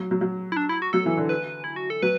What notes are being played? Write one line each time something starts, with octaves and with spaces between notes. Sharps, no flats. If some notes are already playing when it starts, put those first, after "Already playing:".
Already playing: F#3
F#3
F#3
E4
D4
E4
F#4
F#3 A4
E3
D3
B4
E4
F#4
A4
F#3 B4